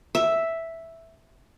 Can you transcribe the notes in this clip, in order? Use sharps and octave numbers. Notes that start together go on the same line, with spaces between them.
E5